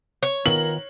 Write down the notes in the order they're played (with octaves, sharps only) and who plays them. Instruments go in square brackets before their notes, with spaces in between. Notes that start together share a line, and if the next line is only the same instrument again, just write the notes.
[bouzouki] C#5
[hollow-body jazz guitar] D#3 B3 F4 [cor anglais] A#4 [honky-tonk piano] F#7